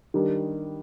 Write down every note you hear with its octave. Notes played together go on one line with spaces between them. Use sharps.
D#3 G3 D4